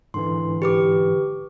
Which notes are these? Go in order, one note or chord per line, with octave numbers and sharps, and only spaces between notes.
G#2 D3 E3 C6
G4 B4 D6